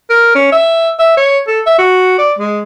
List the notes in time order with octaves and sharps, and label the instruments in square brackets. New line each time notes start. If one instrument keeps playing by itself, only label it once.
[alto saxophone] A#4
C#4
E5
E5
C#5
A4
E5
F#4
D5
G#3